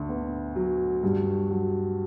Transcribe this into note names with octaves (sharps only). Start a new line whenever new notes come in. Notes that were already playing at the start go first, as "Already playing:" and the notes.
Already playing: D2 D3
B3
F#3
G2
F#3